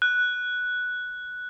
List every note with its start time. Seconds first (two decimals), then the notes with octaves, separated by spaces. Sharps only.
0.02 F#6